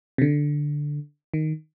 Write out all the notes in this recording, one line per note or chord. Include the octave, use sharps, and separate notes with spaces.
C3
D3
D#3